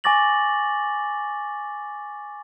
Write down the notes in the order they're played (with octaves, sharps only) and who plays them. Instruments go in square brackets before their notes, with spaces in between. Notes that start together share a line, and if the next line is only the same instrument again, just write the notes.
[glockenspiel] G#5 C#6 D6 A6 A#6 F#7